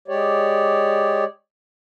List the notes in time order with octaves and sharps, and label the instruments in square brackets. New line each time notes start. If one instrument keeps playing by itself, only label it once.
[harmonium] G#3 G4 C#5 D5